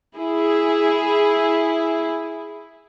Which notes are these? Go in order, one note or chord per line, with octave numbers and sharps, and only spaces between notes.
E4 G#4